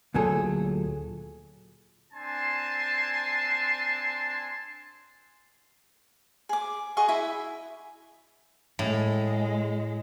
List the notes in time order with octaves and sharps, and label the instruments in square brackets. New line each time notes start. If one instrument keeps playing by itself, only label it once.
[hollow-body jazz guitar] D2 A#2 F#3 G#4 A4
[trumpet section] C4 D4 G#5 A5 C6
[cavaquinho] G#4 D6
F#4 G#4 D#5 C#6
E4 E5
[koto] A2 [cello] G#3